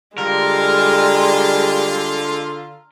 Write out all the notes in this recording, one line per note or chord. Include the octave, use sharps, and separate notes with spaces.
D3 G3 G#3 F4 A#4